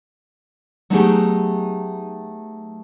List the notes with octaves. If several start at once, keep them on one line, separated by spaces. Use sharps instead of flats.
F#3 A3 B3 D#4 G4 G#4